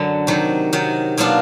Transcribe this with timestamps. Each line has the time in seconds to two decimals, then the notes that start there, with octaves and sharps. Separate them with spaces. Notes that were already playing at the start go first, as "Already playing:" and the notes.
Already playing: F#2 D3 F#3
0.27 C3 D#3 F#3
0.73 C3 D#3 F#3
1.18 B2 F#3 A#3 D4 F4